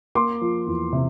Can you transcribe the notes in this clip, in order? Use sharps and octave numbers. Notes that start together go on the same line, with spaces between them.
A#3 C6 D6
F3
E2
C3